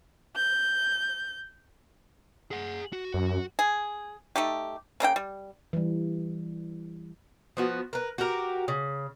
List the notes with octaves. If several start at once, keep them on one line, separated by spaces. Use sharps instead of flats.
G6
G#4 F#5
F#4
F#2
G#4
A3 D#4 G4
C#3 A#3 E4 G5
G3
E3 G3
F3 B3 F#4
A#4 B4
F#4 G4 A#4
C#3